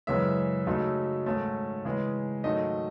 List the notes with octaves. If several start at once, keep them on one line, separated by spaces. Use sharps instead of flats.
F#2 C#3 E3 G#3 C#4 E5
C#3 F#3 A3 D#4
G#2 D#3 A3 C#4
C#3 E3 G#3
G#2 D#3 F#3 A3 D#5